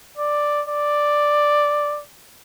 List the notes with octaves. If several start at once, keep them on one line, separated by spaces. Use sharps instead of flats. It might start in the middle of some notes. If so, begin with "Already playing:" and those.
D5
D5